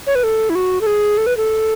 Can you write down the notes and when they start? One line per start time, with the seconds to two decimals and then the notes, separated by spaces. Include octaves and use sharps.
0.07 C#5
0.15 B4
0.24 A4
0.50 E4
0.55 F#4
0.81 A4
0.87 G#4
1.18 A4
1.27 B4
1.37 A4